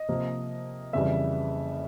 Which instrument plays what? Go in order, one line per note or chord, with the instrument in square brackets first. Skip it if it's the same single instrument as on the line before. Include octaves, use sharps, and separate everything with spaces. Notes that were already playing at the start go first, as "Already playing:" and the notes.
Already playing: [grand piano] D#5
C3 F3 A#3
F2 C#3 E3 G3 E5